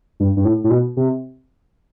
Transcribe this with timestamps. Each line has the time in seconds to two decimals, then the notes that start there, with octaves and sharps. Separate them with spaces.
0.20 G2
0.37 G2
0.45 A2
0.64 A2
0.70 B2
0.97 C3